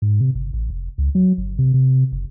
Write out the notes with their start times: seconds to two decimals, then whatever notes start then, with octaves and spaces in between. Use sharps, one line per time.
0.02 G#2
0.20 C3
0.35 G1
0.53 A1
0.70 F1
0.98 C#2
1.15 F#3
1.38 G1
1.59 C3
1.74 C3
2.12 F#1